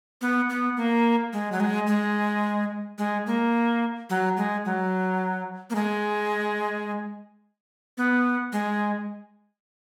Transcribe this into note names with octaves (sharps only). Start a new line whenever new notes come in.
B3
B3
A#3
G#3
F#3
G#3
G#3
G#3
A#3
F#3
G#3
F#3
A#3
G#3
B3
G#3